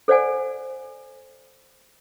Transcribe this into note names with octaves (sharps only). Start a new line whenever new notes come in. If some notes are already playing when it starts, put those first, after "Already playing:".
A4 C5 D5 F#5 G#5